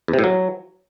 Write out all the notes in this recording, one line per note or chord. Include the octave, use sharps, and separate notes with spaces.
E2
C3
A2
F#3